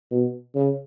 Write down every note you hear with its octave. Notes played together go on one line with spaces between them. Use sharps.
B2
C#3